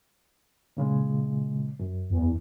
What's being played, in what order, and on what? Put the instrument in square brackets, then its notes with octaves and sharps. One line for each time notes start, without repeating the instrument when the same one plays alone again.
[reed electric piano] A#2 C#3 G#3
F#2
[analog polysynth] E2